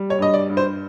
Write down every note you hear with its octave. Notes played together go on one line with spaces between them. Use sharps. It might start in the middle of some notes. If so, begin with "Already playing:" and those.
Already playing: G3
C#5
G2 D#5
D5
G2
C5